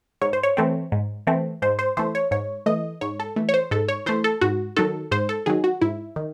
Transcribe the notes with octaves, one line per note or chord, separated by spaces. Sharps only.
G#2 C#5
C5
C#5
E3 A3 C4
G#2
E3 A3 C4
G#2 C5
C5
E3 A3 C5
C#5
G#2 C#5
E3 A3 D#5
G#2 C#5
A4
E3 A3
C#5
C5
G#2 A4
C#5
E3 A3 C5
A4
G#2 F#4
D#3 F#3 A4
G#2 C5
A4
D#3 F#3 G#4
F#4
G#2 E4
D#3